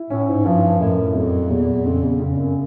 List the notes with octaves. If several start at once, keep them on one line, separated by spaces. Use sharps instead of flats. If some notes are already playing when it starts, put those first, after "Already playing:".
Already playing: E4
A2 C#4
G#2
G2 F3
F#2 A2
F2 F#3
E2 A#2
F2 C#3
E2
F2 C#3
F#2